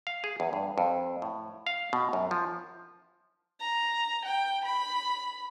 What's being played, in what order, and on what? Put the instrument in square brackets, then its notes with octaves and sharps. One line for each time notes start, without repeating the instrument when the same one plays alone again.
[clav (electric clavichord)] F5
G#4
E2
G2
F2
A2
F5
B2
F#2
F3
[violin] A#5
G5
B5